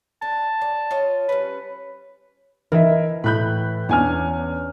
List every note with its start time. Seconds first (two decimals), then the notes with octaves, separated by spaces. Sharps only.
0.22 D4 A5
0.61 D5
0.91 F4 C#5 D#5
1.29 G3 C#4 B4
2.72 E3 A#4 D#5 E5
3.24 A2 B4 B5 F#6 G6
3.89 E2 C#4 D4 G#5 F6